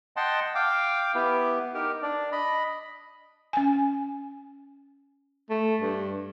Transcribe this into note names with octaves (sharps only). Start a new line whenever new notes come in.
D#5 F#5 G5 A5 C6
F5 G5 D6
B3 E4 G4 B4
D#4 G4 A#4
D4 D5
D#5 B5
C#4 G#5
A3
G2